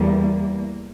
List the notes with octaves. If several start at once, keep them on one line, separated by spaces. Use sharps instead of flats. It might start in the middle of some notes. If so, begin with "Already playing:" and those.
Already playing: E2 E3 G3 A#3